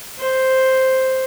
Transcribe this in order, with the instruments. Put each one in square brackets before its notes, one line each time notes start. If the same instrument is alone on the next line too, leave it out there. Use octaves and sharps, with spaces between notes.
[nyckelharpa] C5